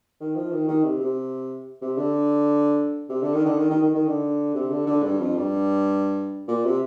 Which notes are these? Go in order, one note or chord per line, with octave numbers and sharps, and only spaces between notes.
D#3
F3
D#3
D#3
C3
C3
C3
D3
C3
D3
D#3
D3
D#3
D#3
D#3
D#3
D3
C3
D3
D3
G2
F2
G2
A#2
C3